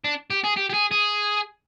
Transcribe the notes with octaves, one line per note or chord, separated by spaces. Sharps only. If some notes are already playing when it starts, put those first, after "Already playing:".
D4
G4
G#4
G4
G4
G#4
G#4